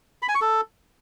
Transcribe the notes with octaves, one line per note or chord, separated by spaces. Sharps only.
B5
G#5
C#6
A4